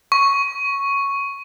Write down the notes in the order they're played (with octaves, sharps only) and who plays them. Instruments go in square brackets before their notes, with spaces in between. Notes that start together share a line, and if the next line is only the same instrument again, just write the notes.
[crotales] C#6